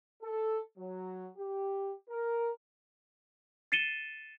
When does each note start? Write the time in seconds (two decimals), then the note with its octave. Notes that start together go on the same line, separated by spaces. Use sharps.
0.22 A4
0.78 F#3
1.37 G4
2.10 A#4
3.72 A6 C7 C#7 D#7 E7 G7